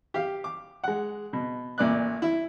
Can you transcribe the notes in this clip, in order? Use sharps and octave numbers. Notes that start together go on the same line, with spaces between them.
G4 F5
D6
G#3 F#5
B2
A1 A#2 D5 F#6
E4